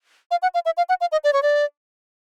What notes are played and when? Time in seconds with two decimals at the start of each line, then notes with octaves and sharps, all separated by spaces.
0.31 F5
0.42 F#5
0.54 F5
0.65 E5
0.77 F5
0.89 F#5
1.01 F5
1.12 D#5
1.24 D5
1.33 C#5
1.43 D5